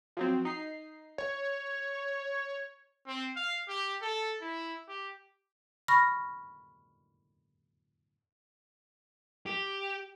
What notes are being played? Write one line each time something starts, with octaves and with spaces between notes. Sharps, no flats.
F3 F#3 C4
D#4 C7
C#5
C4
F5
G4
A4
E4
G4
B5 C#6 F6 A#6
G4